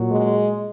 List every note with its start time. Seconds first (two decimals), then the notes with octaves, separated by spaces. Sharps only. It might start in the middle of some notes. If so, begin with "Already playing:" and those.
Already playing: A#2 F#3
0.10 G#3